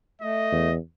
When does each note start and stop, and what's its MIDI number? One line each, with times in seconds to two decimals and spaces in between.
0.22 0.69 57
0.22 0.74 75
0.52 0.78 40